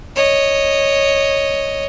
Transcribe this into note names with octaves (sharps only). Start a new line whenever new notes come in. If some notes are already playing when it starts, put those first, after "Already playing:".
C#5 D#5